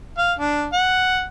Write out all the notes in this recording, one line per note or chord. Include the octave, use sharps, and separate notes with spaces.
F5
D4
F#5